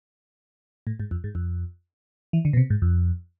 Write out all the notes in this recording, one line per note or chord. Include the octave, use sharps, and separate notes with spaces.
A2
G#2
F2
G#2
F2
E3
D3
B2
C3
G#2
F2